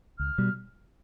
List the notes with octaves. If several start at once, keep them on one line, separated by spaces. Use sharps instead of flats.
C#2 F6
B2 G3